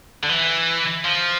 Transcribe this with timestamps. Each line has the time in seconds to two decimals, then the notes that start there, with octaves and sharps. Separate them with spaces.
0.23 D3
0.29 E3
1.05 F3